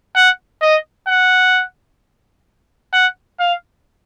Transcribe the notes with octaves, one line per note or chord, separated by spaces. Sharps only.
F#5
D#5
F#5
F#5
F5